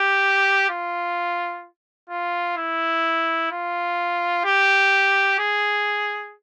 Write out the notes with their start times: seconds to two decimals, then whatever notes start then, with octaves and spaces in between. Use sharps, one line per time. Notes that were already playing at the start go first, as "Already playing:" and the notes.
Already playing: G4
0.69 F4
2.09 F4
2.57 E4
3.51 F4
4.45 G4
5.39 G#4